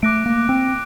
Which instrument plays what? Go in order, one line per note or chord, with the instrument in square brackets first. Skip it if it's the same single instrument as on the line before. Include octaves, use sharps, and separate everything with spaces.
[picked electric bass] A3 [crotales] D6 F#6 A#6 D7
[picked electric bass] A#3
C4